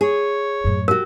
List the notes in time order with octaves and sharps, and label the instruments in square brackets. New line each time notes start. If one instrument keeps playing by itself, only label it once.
[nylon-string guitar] G#4 [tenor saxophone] C#5
[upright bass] F#2 A2
[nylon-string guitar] F#4 G4 [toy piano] A#4